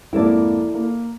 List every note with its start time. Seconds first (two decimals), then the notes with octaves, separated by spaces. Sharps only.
0.13 F2 G#2 A#3 E4 A4 D5
0.74 A#3